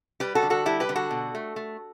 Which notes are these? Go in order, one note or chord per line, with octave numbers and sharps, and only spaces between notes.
G3 G4 B4
F#4 A4
D3
F#4 A4
G3 E4 G4
G4 B4
D3
F#4 A4
B2
A3
A3